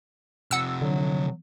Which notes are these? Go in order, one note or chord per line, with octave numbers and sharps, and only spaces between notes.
C3 F3 F#5 E6
D3 F#3